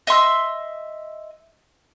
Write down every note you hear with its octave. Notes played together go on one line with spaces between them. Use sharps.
D#5 E5 C6 E6